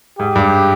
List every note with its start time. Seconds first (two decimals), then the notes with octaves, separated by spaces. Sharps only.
0.19 G#2 G4
0.36 G2